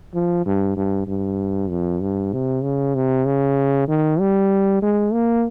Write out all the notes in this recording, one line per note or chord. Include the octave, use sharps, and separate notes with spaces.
F3
G2
G2
G2
F2
G2
C3
C#3
C3
C#3
D#3
G3
G#3
A#3